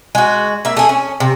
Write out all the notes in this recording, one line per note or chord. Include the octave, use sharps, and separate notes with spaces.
G#3 F#4
A#3 E5
A3 G#4
C#4
C3